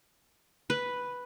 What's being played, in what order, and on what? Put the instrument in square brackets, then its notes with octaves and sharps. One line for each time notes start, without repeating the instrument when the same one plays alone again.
[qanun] B4